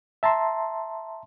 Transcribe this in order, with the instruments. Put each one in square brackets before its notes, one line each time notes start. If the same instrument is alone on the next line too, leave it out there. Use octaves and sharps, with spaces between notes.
[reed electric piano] E5 A5 A#5 C6